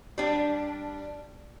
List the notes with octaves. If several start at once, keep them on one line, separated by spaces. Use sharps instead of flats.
G3 D4